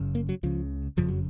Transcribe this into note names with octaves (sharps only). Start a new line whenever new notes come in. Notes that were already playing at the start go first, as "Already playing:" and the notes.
Already playing: F#1 F#2 C#3
A#3
F#3
C#2 C#3 F3
F#1 F2 C#3 F3
F#3